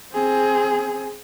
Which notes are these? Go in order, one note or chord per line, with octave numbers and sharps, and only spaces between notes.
C4 G#4